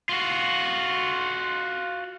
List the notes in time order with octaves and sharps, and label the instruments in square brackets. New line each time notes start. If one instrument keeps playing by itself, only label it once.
[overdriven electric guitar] F4 F#4